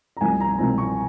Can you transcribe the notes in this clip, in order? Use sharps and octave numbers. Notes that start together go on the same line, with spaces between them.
A#5
C2 C3 F3 C4 G#5
A#5
C2 C3 F3 C4 A#5
C#6